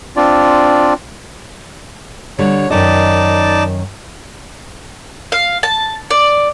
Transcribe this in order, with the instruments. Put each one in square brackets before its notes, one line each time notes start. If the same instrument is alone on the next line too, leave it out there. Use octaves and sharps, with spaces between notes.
[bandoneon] C4 D4 F4 D5
[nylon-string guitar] D3 G3 [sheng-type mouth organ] C#5
[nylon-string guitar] F#2 D#3 D#5 [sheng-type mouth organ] D#4 D5 A5
[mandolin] F5
A5
D5